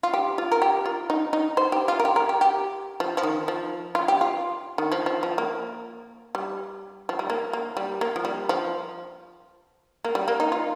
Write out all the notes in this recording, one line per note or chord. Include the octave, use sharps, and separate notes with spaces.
F4
G4
F4
A#4
G4
F4
D#4
D#4
C5
G4
F4
A#4
G4
A#4
G4
G4
F3
F3
D#3
F3
F4
G4
F4
D#3
F3
F3
F3
A#3
G3
F3
G3
A#3
A#3
G3
A#3
F3
G3
F3
A#3
G3
A#3
D#4
F4